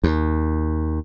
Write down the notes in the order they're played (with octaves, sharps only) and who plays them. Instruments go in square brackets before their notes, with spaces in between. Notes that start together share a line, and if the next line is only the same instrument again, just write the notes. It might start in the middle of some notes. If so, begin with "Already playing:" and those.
[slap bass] D#2